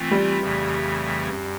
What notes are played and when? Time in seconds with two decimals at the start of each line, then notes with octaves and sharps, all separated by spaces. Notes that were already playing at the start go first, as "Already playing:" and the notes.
Already playing: E3 A3 C4 F4
0.11 G3
0.40 F2 C#3 E3 A3
1.28 F#2